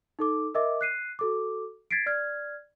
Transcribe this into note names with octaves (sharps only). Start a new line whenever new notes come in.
D#4 A4 D6
A#4 D#5 E5 D6
F#6 C7 D#7
F#4 A4 D6
G#6 A6 B6 C7 D7
D5 F6 G#6